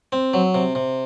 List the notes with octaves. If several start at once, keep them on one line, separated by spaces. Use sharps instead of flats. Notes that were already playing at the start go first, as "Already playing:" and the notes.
C4
F#3
C3
C3